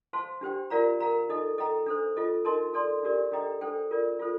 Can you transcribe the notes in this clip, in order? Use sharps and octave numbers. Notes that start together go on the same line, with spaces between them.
C5 F5 A5 C6
D4 G4 C5 G5
F4 A#4 D5 F5 A#5
A#4 F5 A#5
D#4 A4 D#5
A4 D#5 G5 A#5
D4 A4 C5
F4 A4 D#5
D#4 A#4 D#5 A5 C6
A4 D5 A5 C6
D4 G4 A#4 D5
D4 A4 D#5 G5 A#5
D4 A4 C5 G5
F4 A#4 D5
F4 A4 C5